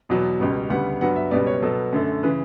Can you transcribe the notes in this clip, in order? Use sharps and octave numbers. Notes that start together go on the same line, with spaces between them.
E2 B2 F#3 B3
C#2 B2 G3
D2 C#3 G3 B3 F#5
G2 F#3 B3 F#5
E5
C#2 B2 G3 B3 D5
C#5
B2 F#3 B3 A4
F#2 D3 A3
C#3 E3 B4